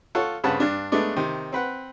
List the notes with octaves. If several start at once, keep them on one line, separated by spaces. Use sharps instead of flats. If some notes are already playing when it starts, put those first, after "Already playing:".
F4 A4 C#5 F#5
G2 C#3 C4 B4 F#5 A5
G2 D4
G#3 A3 B3 D4 D5
C3 D#3
C4 B4 F#5